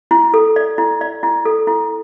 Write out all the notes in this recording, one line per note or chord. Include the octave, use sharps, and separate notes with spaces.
E4
A4
D5
E4
D5
E4
A4
E4